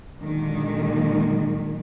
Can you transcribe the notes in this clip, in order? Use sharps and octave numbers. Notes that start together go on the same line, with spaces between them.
A#2 D3 D#3 F#3 G#3